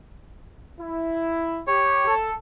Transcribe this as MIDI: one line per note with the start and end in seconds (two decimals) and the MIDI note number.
0.79 1.60 64
1.67 2.03 67
1.67 2.14 73
2.07 2.34 69